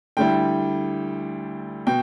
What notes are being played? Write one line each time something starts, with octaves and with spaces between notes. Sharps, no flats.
D2 D3 G3 E4 G5
B2 G5